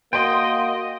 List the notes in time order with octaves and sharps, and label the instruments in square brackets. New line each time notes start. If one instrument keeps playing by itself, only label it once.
[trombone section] A#3 F#4 [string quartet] D#5 [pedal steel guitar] G5 [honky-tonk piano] C6